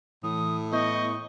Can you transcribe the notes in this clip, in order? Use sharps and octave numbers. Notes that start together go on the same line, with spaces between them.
A2 E3 D#6
B3 E4 D#5 C#6 G6